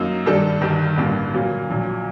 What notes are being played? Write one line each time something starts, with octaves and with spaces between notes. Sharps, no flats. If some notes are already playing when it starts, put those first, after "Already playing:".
Already playing: F#2 F#3 A#3 D#4
G2 D#3 G3 D4 A4
G1 G2 D#3 G3
A1 G2 D3 G3 A#3
A#2 F#3 A#3
A#1 A#2 F#3